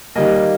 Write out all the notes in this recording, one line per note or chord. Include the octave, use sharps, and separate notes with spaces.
D#3 G3 A#3 D#5